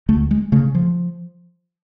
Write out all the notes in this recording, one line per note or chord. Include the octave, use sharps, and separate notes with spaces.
D2 A3
G#3
C#3 A3
F3